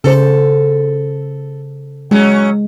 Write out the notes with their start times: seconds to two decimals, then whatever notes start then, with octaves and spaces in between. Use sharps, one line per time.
0.04 C#3 A4 C5
2.11 F#3 G#3 C#4